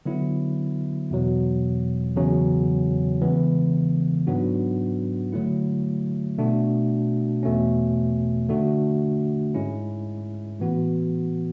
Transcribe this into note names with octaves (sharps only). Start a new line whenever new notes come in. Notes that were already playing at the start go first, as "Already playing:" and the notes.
D3 F#3 B3 E4
E2 B2 F#3
E2 C#3 F#3 C#4
C#3 E3 G#3 B3
G#2 F#3 B3 D4 F#4
D3 F#3 A3 E4
B2 A3 D4 F#4
E2 B2 A3 C#4
D3 A3 D4 F#4
G#2 G#3 C#4 E4
A2 E3 B3 F#4